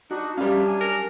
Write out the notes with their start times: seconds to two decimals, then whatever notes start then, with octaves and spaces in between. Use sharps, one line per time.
0.11 D4 D#4 F#4
0.37 F#3 G3 C#4 D4 E5 F5
0.68 G#5
0.81 A#4